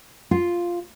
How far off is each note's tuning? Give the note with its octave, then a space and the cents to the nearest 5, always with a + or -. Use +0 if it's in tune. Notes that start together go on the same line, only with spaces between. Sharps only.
F4 +0